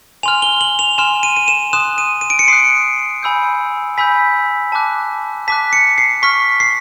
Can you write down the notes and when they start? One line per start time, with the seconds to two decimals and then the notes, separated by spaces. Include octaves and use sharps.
0.23 G#5 C6 F6 F7
0.42 G7
0.61 F#7
0.79 F7
0.98 G#5 C6 F6 E7
1.23 D#7
1.37 D#7
1.48 E7
1.73 C6 D#6 F#6 E7
1.98 D#7
2.21 D#7
2.30 D7
2.39 C#7
2.48 C6 D#6 F#6 C7
3.23 G#5 B5 E6 G6
3.98 G#5 B5 E6 G6 B6
4.72 A5 D6 F#6
5.48 A5 D6 F#6 B6
5.73 C#7
5.98 C7
6.23 C#6 F6 B6
6.60 C7